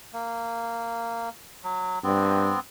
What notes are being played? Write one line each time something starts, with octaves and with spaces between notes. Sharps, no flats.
A#3
F#3
G2 B3 C4